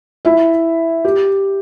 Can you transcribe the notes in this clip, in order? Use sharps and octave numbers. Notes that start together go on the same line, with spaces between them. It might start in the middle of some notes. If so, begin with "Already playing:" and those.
E4 E5
G4